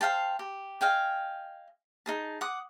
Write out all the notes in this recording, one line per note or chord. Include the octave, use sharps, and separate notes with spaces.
C5 F5 G5 A5
G4
D#5 F5 G5 G#5
D#4 G#4 A5
F#5 D6 D#6